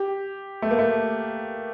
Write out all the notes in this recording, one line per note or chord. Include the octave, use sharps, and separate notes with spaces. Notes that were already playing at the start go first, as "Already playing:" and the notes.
Already playing: G4
A3
A#3
A3